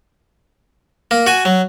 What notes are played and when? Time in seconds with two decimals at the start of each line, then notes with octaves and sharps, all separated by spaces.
1.11 A#3
1.27 F#4 G#5
1.45 F#3